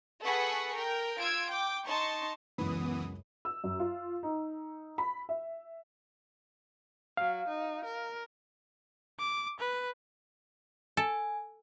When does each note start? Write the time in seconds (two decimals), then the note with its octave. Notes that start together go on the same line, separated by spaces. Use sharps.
0.23 G#4 A4 B4 F#5 C#6 B6
0.74 A#4 G5
1.19 F4 E6 G#6 D7
1.48 G5 D6
1.85 D#4 A5 C6 C#6
2.58 C#2 F#2 E3 B3 B5 D#6
3.45 E6
3.64 F#2
3.80 F4
4.23 D#4
4.98 B5
5.29 E5
7.17 F#3 F5
7.48 D#4
7.85 A#4
9.20 D6
9.60 B4
10.97 A4 G#5